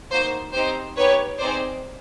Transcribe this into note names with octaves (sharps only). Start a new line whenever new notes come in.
A#3 D#4 F#4 C5
C4 D#4 G4 C5
B3 D#4 G4 B4 C#5
C4 D#4 G#4 C5 D5